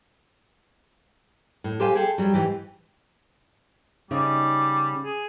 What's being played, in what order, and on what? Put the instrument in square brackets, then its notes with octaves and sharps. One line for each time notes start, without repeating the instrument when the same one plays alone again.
[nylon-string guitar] A2
G4 A4 C5 F5 G#5
G#4 A4 G5
F#3 G3
G#2 E3 G4
[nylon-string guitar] C#3 C#4 D#4 [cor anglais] G3
[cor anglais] G#4